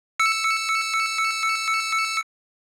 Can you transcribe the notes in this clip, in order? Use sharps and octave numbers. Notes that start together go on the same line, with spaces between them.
E6 C#7